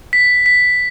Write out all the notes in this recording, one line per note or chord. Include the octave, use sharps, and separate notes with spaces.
B6
B6